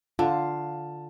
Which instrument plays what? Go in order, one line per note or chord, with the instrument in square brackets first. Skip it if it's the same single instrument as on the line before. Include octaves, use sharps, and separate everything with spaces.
[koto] D3 [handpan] F4 [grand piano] A5